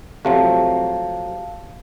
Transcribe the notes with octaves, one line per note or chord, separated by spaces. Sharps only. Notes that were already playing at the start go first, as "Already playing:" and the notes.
C3 F3 F#3 A3 F5 A5